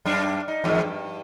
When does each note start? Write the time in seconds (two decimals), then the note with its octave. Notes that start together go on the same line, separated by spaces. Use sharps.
0.05 F#2 D4
0.48 D#4
0.64 E2 G#2 D#3
0.82 G2